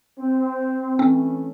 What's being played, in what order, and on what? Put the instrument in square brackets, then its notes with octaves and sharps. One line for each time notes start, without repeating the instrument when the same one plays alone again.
[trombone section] C4
[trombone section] E3 A3 C#4 [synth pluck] C4